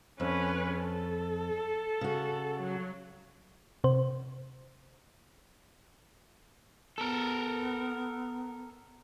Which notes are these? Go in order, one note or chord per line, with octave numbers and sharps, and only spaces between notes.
F2 C#4 B4
A4
C#3 F#4
F#3
C3 C5
B3 A4 A#4